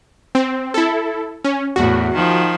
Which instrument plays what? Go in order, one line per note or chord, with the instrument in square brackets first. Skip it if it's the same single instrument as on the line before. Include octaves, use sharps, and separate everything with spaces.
[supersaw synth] C4
E4 A4
C#4
[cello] E2 A2 [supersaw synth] F#4
[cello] D#3 F3